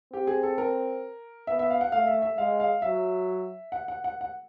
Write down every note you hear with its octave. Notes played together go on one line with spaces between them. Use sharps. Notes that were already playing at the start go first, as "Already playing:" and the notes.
C4 G4
G#4
A4
A#4
B3 E5
E5
F5
F#5
A3 F5
E5
E5
G#3 F5
F5
F#3 E5
F#5
F#5
F#5
F#5